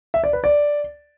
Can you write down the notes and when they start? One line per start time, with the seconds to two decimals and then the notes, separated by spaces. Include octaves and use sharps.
0.14 E5
0.24 D5
0.33 B4
0.44 D5